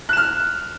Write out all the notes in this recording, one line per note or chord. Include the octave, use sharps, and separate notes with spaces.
F6 F#6 E7